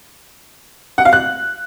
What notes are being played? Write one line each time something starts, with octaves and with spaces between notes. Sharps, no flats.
F#5
F5
F#6